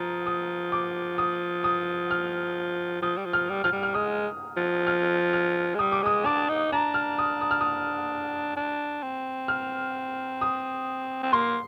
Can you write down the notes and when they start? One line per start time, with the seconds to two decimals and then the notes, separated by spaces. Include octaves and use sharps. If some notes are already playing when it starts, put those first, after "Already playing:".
Already playing: F3 A#5 D#6
0.27 D#6
0.72 D6
1.18 D#6
1.64 D#6
2.11 F6
3.02 F3 D#6
3.17 G3
3.25 F3
3.33 F6
3.49 G3
3.64 F3 F6
3.72 G3
3.83 F6
3.95 G#3 D#6
4.57 F3
4.87 F6
5.33 F6
5.75 G#3
5.79 G3 D#6
5.92 D6
6.03 G#3 D#6
6.25 D4 D6
6.49 D#4
6.72 D4 A#5
6.94 F6
7.18 D#6
7.41 D#6
7.51 F6
7.61 D#6
8.56 D4
9.03 C4
9.48 F6
10.41 D#6
11.23 C4
11.33 A#3 C6